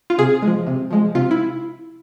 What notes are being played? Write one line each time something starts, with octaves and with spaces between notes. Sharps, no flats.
F4
C3 G#4
F3 G#3
C3
F3 G#3
C3 F4
E4